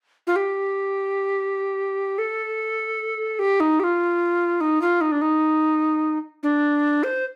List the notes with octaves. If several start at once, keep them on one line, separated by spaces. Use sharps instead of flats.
F4
G4
A4
G4
D#4
G4
F4
D#4
F4
D#4
D4
D#4
D4
C5